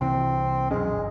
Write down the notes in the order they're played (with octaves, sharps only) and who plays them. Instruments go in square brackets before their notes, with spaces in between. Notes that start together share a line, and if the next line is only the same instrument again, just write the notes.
[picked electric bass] C2 C3 E3 [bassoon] C4
[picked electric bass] F#2 B2 C#4 [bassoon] G#3
[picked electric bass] G1